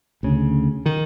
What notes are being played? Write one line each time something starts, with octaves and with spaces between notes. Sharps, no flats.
D2 C#3
D#3